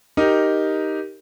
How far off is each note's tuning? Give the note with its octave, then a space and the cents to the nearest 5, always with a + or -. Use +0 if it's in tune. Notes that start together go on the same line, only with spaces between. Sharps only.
D#4 +0 G4 -5 A#4 +0